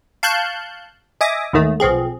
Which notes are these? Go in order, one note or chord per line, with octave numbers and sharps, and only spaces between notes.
F5 A5 C#6 F#6 G6
D#5 E5 G#5 D6 D#6
D#2 G#2 D#3 A3
B1 F3 C4 G#4